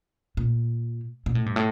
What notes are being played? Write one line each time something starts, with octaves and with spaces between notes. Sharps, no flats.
A#2
A#2
A2
G2
A2